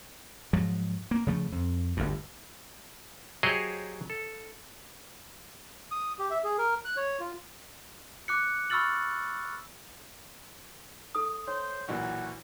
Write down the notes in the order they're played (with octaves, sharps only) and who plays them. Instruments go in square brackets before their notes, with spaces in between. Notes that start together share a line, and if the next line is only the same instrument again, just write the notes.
[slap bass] G#2 F3 F#3
A#3
C#3 F3 A3
F2
G1 D2 G2
[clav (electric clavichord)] F#3 G4 G#4 C5 C#5 D#5
A4
[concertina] D#6
G4
E5
G#4
A#4
F#6
C#5
F4
[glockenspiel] D6 F#6 C#7
B5 C#6 E6 F6 A6 F#7
[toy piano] A4 D#6
[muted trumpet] C5 [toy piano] C#5
[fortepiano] B1 A#2 E3 [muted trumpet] F#4